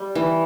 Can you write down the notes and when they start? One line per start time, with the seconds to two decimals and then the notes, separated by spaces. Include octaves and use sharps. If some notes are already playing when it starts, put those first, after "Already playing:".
Already playing: G3
0.15 E3